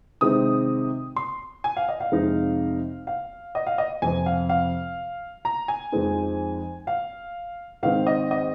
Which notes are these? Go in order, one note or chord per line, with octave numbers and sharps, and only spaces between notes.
C3 D#3 G#3 C4 D#4 D#6
C6
G#5
F5
D#5
F5
F2 C3 G#3 D#4
F5
D#5
F5
D#5
F2 C3 F3 G#5
F5
F5
A#5
G#5
F2 F3 G#3 C4 D#4
F5
G#2 D#3 C4 F5
D#5
D#5